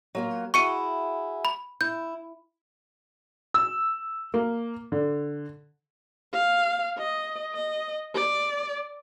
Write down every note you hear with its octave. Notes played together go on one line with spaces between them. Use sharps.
F#3 A#3 F4
E4 F#4 G#4 C#6 C#7 D#7
B5
E4 G6
E6
A#3
D3
F5
D#5
D#5
D5